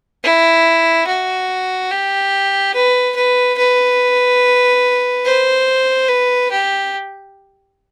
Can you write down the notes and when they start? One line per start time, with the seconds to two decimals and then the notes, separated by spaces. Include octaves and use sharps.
0.24 E4
1.07 F#4
1.91 G4
2.75 B4
3.16 B4
3.58 B4
5.25 C5
6.09 B4
6.51 G4